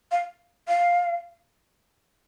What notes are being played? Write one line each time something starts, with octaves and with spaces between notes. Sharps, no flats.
F5
F5